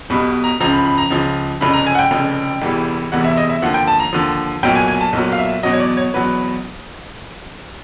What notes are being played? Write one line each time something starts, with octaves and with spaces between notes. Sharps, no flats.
B1 B2 G3 B5
A#5
C#2 C#3 F3 A#5
B5
B5
A#5
C#2 C#3 F3
F1 F2 C#3 B5
A#5
G#5
F#5
G5
F1 F2 C#3
E1 E2 C3 E3 G3
E1 E2 C3 E3 G3 F#5
E5
D#5
E5
D#2 D3 F3 F#5
G5
A5
A#5
D#2 D3 F3
B1 A#2 F#3 G5
G#5
G#5
A5
B1 A#2 F#3
F5
E5
E2 B2 F#3 D#5
C#5
D5
C#5
E2 B2 F#3 B4